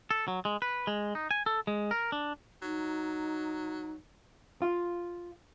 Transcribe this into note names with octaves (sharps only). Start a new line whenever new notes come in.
A4
F#3
G#3
B4
G#3
D#4
G#5
A4
G#3
A#4
D4
F#3 D#4
F4